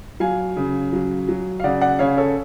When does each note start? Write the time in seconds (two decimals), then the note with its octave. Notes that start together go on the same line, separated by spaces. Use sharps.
0.20 F#3 F5 G#5
0.57 C#3
0.93 F#3
1.28 F#3
1.60 F5
1.64 C#3 D5 F#5
1.81 D5 F#5
1.99 C#3 C#5 F5
2.17 A4 C#5